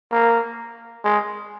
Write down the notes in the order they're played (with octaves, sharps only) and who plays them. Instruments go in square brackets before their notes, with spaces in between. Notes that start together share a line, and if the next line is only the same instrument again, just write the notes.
[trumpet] A#3
G#3